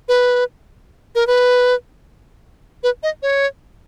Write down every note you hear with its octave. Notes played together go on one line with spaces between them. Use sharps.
B4
A#4
B4
B4
D#5
C#5